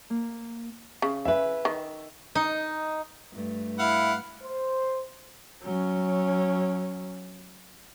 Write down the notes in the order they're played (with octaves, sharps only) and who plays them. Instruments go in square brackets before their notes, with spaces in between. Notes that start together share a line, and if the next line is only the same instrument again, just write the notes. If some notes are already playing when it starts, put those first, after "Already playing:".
[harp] A#3
[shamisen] C#3
[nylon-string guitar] G#4 B4 [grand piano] E5
[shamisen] D#3
[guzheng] D#4
[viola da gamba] G2 A3
[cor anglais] E4 [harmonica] F5 F#5
[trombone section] C5
[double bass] F#3 C#4